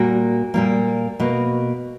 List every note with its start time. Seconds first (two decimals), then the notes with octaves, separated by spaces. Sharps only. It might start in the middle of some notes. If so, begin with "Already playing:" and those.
Already playing: A#2 G3 A#3 F#4
0.54 A#2 G3 A#3
1.20 B2 A#3